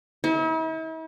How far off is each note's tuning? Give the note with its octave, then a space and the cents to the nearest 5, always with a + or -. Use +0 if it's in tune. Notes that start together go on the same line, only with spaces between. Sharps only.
E4 -45